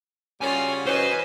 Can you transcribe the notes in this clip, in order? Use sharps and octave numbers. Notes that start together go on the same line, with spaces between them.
C#3 G3 C#4 F4 F#4 G#5
F#2 E3 C#4 B4 C5 D#5 G#5